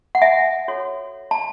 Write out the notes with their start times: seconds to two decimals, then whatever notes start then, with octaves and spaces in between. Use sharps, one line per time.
0.15 F#5
0.22 E5 G#5
0.68 F#4 A4 C#5
1.31 A5